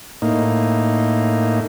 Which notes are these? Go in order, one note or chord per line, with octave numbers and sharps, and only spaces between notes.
A2 A#3 D#4